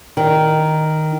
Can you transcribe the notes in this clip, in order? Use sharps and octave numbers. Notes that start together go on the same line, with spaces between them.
D#3